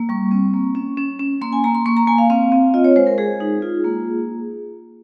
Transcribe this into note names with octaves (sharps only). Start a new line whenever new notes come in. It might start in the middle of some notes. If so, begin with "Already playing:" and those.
Already playing: A#3
G3 C#6
C4
A#3
C#4
C#4
C#4
A#3 C6
G#5
A#3 A#5
C6
A#3 C#6
A#5
A#3 G#5
F5
C4 F5
C4
F4 D#5
C#5
G#3 C5
A#4
G#3 G#4
D#4
F4
A#3